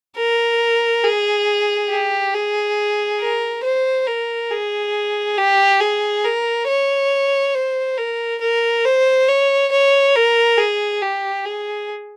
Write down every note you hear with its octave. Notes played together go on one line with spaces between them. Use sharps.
A#4
G#4
G4
G#4
A#4
C5
A#4
G#4
G4
G#4
A#4
C#5
C5
A#4
A#4
C5
C#5
C#5
A#4
G#4
G4
G#4